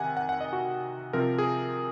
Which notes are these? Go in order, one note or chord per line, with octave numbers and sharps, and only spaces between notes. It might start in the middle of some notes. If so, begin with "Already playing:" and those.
Already playing: C3 D#3 F#5 G#5
F#5
F#5
D#5
F#4
C3 F3 C4 A#4
G#4